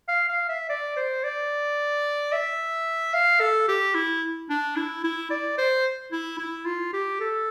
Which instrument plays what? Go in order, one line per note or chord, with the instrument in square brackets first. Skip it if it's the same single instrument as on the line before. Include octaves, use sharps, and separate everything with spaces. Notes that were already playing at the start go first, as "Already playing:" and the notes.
[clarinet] F5
F5
E5
D5
C5
D5
E5
F5
A4
G4
E4
D4
E4
E4
D5
C5
E4
E4
F4
G4
A4